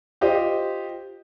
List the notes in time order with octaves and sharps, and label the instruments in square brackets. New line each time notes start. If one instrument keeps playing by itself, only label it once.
[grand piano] F4 G4 C5 D#5